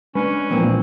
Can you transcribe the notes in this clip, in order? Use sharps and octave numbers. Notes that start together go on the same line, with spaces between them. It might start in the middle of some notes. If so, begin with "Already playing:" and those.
G#3 C#4 D4 B4 D5
A#2 E3 F3 A#3 C4